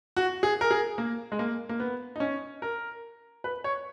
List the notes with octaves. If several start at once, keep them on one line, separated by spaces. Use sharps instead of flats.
F#4
G#4
A#4
G#4
A#3
G#3
A#3
A#3
B3
D#4
C#4
A#4
B4
C#5